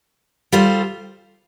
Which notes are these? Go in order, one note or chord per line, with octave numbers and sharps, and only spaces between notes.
G3 F4 A4 C5